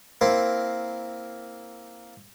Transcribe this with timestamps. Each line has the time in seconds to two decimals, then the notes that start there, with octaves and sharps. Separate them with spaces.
0.21 A#3 C4 E4 A#4 C5